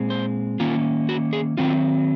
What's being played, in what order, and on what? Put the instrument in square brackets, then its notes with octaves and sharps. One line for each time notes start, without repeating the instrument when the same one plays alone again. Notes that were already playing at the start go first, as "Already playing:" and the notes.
Already playing: [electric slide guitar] A#2 G#3 C4
C5
D#3 A#3 C#4 F4
F#4
G#4
D#3 F#3 C4 F4